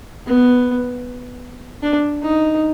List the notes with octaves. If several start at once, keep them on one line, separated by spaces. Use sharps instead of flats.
B3
D4
D#4